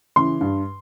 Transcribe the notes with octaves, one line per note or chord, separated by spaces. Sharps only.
C#3 E3 C6
G2